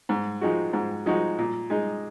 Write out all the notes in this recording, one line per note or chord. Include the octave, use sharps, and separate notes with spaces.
G#2
F3 G#3 D#4 F#4
G#2
F3 G#3 D#4 F#4
A#2
G#3 D#4